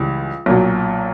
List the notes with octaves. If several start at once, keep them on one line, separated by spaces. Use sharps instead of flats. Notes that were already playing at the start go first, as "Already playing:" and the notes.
Already playing: C#2 C#3 E3 G3
B1 A#2 F#3